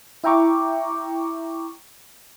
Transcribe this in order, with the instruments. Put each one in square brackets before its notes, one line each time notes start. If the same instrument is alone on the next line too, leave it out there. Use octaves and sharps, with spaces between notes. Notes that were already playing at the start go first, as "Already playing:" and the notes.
[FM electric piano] E4 E5 G5 A#5 C#6 D6